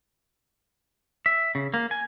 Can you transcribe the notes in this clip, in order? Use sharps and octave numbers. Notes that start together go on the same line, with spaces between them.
E5
C#3
A#3
G#5